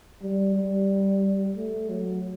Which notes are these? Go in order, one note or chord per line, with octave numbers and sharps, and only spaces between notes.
G3
G3
A3
F#3